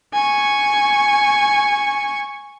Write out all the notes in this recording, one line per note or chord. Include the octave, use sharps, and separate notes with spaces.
G#5 C#6